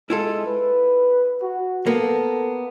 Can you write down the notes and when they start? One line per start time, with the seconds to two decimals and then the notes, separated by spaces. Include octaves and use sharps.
0.10 G#3 E4 F4 A4
0.46 B4
1.42 F#4
1.86 A#3 B3 A4